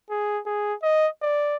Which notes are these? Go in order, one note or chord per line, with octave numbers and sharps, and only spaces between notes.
G#4
G#4
D#5
D5